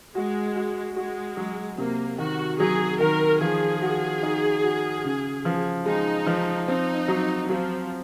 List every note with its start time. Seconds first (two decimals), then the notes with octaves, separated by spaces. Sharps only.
0.15 G#3 F#4
0.56 F#4
0.96 G#3 F#4
1.37 F#3
1.78 C3 A#3
2.18 D#3 F#4
2.59 F#3 G#4
3.00 D#3 A#4
3.41 F3 G#4
3.82 F#4
4.23 D#4
4.64 F#4
5.04 C#3
5.45 F3
5.86 G#3 D#4
6.26 F3
6.68 C4 D#4
7.08 F#3
7.49 F3 F#3